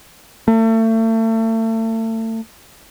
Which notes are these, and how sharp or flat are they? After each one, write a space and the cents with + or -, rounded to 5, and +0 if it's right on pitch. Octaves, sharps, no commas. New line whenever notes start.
A3 +35